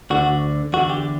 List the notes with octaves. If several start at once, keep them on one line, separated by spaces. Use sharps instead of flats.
D2 D3 F#4
E2 D3 F#4
G4